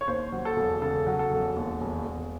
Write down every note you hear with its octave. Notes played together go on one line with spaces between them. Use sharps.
C#5
D#2 C5
F#3
A4
E1
C#3 A4
F#3
A4
E1
D#2
E1
E1